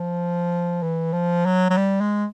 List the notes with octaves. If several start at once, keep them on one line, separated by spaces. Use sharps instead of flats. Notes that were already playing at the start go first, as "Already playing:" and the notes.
Already playing: F3
E3
F3
F#3
F#3
G3
G#3